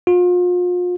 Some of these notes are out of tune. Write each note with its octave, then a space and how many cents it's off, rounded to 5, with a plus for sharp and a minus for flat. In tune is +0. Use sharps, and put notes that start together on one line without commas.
F4 +40